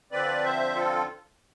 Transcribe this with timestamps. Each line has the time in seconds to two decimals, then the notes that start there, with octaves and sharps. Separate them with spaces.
0.11 D3 F3 C4 B4 D5
0.44 C5 E5
0.75 F4 A4